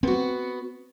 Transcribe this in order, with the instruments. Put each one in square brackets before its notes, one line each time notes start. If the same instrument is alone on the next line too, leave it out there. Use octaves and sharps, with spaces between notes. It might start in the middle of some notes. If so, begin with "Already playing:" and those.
[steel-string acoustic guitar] B3 F#4 [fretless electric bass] C4